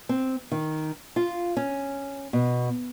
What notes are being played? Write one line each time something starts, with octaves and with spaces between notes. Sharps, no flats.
C4
D#3
F4
C#4
B2